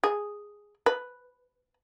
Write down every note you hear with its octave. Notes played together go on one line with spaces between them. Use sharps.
G#4
B4